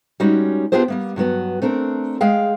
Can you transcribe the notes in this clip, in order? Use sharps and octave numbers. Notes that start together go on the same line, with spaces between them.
G3 G#3 C#4 D#4 F#4
B3 D4 F4 G4 G#4 C5
G3 A#3 B3
G2 F#3 B3 F#4
A3 C4 D4 A4 A#4
G#3 G#4 F5 G5